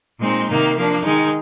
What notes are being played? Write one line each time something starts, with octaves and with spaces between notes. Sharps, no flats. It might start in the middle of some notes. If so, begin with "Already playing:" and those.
A#2 G#3 C4 D#4
C3 D#3 A#3 D#4
F3 A#3 D4
D#3 G#3 D#4